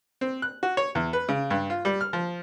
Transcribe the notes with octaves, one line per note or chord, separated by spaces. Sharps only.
C4
F#6
F#4
C#5
E2
B4
C#3
G2
F4
G3
F6
F3